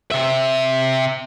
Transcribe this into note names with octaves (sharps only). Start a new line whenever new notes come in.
C3 E5